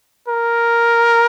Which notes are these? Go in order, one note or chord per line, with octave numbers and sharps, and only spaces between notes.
A#4